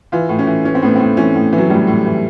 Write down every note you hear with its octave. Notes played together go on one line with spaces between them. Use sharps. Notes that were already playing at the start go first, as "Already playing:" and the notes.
E3 F4
A2
C#4
E3
E3 C#4
C4
A2 B3
A2 C4
E3 C#4
A2
E3
F#3
A2 G3
A2
E3